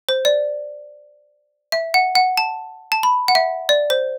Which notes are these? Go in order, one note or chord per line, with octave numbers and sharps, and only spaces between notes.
C5
D5
E5
F#5
F#5
A5
A5
B5
F#5
E5
D5
C5